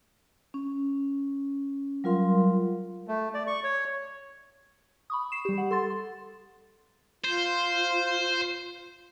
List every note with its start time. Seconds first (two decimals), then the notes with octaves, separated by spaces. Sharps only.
0.54 C#4
2.04 F#3 G3 F4 A#4 F5 C6
3.08 A3
3.34 D5
3.47 C#6
3.64 C#5
5.10 B5 C#6 D#6
5.32 C7 E7
5.45 G3 G4
5.58 F#5
5.71 A4 C6 A6
5.90 C6
7.25 F4 C5